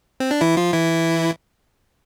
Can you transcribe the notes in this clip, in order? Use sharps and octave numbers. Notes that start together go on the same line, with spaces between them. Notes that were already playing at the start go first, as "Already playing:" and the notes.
C4
D4
E3 E4
F3 F4
E3 E4